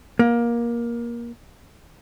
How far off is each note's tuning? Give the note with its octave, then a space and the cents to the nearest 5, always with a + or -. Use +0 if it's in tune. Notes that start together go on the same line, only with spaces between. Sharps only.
A#3 +20